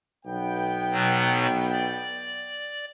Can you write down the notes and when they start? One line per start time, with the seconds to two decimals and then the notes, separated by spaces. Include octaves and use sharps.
0.25 B1 B3 G5
0.92 B2 F#3
1.72 D5